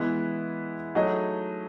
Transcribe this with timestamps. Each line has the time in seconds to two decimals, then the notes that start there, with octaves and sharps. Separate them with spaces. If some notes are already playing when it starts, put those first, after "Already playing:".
Already playing: E3 G#3 B3 E4 G#4
0.95 F#3 A3 D#4 G#4 D#5